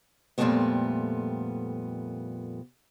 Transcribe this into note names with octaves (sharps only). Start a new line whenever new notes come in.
F2 A#2 D3 G3 A3 B3